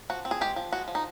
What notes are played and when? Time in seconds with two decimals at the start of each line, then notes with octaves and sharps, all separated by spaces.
0.10 F3 F#4
0.25 C4
0.31 G#4
0.41 G#3 G4
0.56 F3
0.72 G#3 F#4
0.88 F3
0.95 D#4